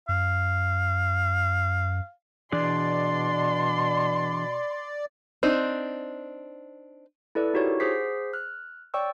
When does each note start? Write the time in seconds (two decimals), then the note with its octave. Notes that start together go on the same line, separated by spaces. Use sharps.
0.09 F#2 F5
2.52 B2 E3 D4 G#4 D5 C6
5.43 C4 D4 D#4
7.35 E4 A4 B4 D5
7.54 D#4 E4 F#4 G4 A#4 C#5
7.80 G#4 C5 F#5 D6 B6 C7
8.33 F6 F#6
8.94 C#5 D5 G5 C#6 E6